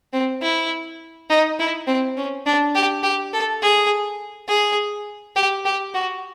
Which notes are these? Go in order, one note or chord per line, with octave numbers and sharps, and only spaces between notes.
C4
E4
D#4
E4
C4
C#4
D4
G4
G4
A4
G#4
G#4
G4
G4
F#4